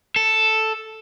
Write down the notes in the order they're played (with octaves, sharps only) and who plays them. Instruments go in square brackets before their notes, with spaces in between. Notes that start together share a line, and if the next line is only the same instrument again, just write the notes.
[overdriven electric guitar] A4